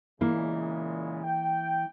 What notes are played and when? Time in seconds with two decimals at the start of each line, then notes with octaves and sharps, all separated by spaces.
0.21 A#2 C#3 E3 G#3 A#3 E4
1.24 G5